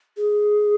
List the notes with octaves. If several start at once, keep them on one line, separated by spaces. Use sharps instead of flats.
G#4